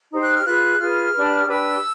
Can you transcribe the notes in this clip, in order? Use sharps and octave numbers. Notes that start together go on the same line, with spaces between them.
D#4 G4 C5
F#6
F6
F4 G#4 B4 F#6
F4 G#4 B4 F6
D4 G4 B4
D#6
D4 G4 B4 E6